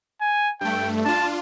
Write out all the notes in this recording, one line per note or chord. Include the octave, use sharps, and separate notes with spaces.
G#5
G2 A3 G5
D4 F4 A5